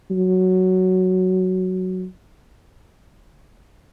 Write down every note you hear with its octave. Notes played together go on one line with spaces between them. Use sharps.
F#3